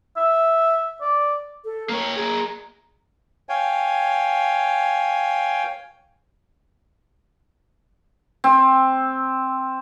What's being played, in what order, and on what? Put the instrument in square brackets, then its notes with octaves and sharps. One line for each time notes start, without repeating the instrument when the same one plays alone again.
[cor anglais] E5
D5
[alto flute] A4
[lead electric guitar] A#3 C#5 [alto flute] A#5
[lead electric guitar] A#3 G#4 [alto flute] A#5
[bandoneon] C#5 F5 G5 G#5
[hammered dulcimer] C4